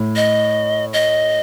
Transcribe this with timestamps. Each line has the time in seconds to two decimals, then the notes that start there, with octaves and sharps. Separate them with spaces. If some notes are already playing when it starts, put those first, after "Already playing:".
Already playing: A2
0.16 D#5
0.93 D#5